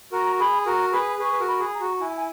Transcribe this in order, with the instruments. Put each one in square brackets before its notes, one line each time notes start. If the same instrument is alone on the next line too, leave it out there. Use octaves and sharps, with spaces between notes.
[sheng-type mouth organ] F#4 A#4 [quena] A#5
[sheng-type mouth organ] G#4 [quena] B5
[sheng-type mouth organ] F#4 A#4 [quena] A#5
[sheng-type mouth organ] G#4 B4 [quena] B5
[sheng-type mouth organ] G#4 B4 [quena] C#6
[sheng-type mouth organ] B4
F#4 A#4
[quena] B5
[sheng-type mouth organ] G#4
[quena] A#5
[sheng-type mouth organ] F#4
[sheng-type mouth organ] E4 [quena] G#5
[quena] G#5